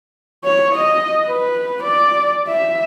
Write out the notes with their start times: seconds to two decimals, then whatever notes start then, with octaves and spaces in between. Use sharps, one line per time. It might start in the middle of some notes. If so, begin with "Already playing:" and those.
0.45 C#5
0.75 D#5
1.27 B4
1.83 D5
2.48 E5